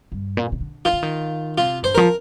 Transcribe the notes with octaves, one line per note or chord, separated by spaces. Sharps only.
G2
A#2
C3
D3
D#3 F4
D3
D#3
C3 F4
G2 C5
F3 A#4